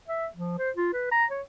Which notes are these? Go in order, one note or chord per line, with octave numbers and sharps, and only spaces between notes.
E5
F3
C5
F4
B4
A#5
C#5